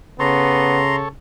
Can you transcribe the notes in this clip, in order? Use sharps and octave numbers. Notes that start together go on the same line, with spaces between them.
C#3 B3 A4 C#5 A#5 C6